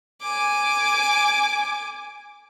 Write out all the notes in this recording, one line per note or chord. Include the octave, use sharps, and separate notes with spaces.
G#5 D6